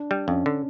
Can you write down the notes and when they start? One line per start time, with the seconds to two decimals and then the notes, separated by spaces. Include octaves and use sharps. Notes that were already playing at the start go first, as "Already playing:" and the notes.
Already playing: D4
0.11 G3
0.28 F2 C#4
0.46 D3